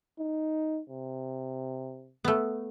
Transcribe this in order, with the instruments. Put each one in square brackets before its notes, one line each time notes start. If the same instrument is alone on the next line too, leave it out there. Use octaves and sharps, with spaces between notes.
[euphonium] D#4
C3
[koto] A3 B3